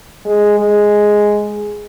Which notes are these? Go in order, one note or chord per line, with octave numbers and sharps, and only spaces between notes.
G#3
G#3